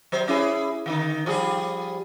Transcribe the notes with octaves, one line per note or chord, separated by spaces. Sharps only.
F#3 C5
C#4 E4 G#4
D3 D#3 D#4
F3 G3 G#4